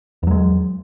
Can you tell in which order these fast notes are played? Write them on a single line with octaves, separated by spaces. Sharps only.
E2 F#3 G#3